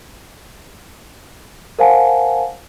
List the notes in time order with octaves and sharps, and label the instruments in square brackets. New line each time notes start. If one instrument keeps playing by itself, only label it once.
[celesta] A#4 C5 F5 F#5 G#5 A5